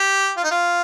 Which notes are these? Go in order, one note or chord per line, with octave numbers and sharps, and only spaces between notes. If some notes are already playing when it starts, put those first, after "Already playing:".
Already playing: G4
F4
D#4
F4